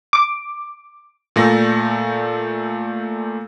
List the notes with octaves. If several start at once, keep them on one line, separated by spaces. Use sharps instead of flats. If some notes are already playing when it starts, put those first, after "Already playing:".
D6
A#2 A3 A#6